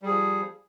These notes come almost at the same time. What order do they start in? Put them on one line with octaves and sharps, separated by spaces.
G3 G#4 F3